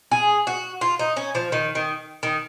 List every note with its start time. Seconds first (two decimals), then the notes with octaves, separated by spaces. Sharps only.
0.11 G#4
0.47 F#4
0.81 F4
0.99 D#4
1.17 C#4
1.35 F3
1.52 D#3
1.75 D#3
2.23 D#3